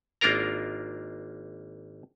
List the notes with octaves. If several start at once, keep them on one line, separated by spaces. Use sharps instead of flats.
G#1 A#3 D4 F4 A#4 A#5